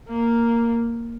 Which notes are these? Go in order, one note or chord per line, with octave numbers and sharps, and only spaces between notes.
A#3